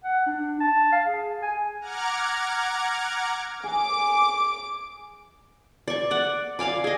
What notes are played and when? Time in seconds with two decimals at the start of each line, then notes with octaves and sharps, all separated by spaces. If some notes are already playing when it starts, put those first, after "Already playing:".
0.04 F#5
0.26 D4
0.60 A5
0.92 F5
1.06 G#4
1.42 G#5
1.81 F#5 A#5 D6 F6 G#6
3.64 G#4 D6
5.88 D5 C#6
6.11 D5 F#5
6.59 D5 F5 G#5 D6
6.84 G#4 D#5